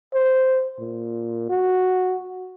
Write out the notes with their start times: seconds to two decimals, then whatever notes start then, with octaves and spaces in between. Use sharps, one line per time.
0.14 C5
0.79 A#2
1.50 F#4